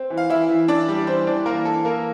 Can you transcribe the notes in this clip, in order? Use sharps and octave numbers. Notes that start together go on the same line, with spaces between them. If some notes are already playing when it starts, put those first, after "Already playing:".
Already playing: C4
E3
F5
E3 E4 E5
E3
E3 D4 D5
G3
E3 C4 C5
E3 D4 D5
E3 A#3 A#4
E3 A4
E3 A#3 A#4